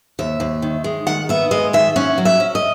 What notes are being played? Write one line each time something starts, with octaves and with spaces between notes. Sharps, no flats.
D#2 E5
D#2
D#3
G#3
D#3 F#5
B3 E5
G#3 D#5
D#3 E5
C#4 F#5
F#3
E5
C#4
D#5